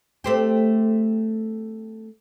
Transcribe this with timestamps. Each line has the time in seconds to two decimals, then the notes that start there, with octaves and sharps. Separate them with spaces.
0.24 A3 C4 G4